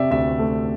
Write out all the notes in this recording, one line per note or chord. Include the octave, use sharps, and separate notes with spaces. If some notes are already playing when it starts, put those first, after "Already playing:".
Already playing: C3 C4 D5 E5
D2 E5
A3